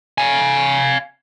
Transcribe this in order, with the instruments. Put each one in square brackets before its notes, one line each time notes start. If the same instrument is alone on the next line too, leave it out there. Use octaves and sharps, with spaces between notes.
[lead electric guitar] F5 G#5